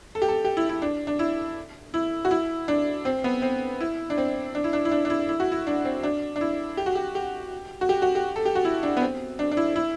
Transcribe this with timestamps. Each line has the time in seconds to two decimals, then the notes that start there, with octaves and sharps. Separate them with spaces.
0.15 A4
0.22 G4
0.29 A4
0.45 G4
0.57 E4
0.69 E4
0.82 D4
1.07 D4
1.19 E4
1.94 E4
2.25 F#4
2.31 E4
2.68 D4
3.05 C4
3.24 B3
3.42 C4
3.81 E4
4.10 D4
4.18 C4
4.55 D4
4.64 E4
4.73 D4
4.85 E4
4.91 D4
5.05 D4
5.10 E4
5.29 E4
5.40 F#4
5.52 E4
5.67 D4
5.85 C4
6.03 D4
6.36 D4
6.41 E4
6.77 G4
6.86 F#4
6.95 G4
7.15 G4
7.81 F#4
7.89 G4
8.02 F#4
8.15 G4
8.36 A4
8.45 G4
8.55 F#4
8.65 E4
8.83 D4
8.97 B3
9.02 C4
9.39 D4
9.51 D4
9.57 E4
9.76 E4